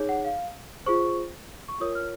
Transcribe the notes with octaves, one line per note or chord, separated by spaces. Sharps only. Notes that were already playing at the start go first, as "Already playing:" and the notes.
Already playing: D#4 G#4 C#5
F#5
F5
F4 G#4 C5 C#6
C#6
F4 A#4 C#5 D#6
F6